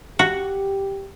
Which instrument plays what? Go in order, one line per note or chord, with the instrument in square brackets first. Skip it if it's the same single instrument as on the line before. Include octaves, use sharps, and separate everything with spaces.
[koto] F#4 [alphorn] G4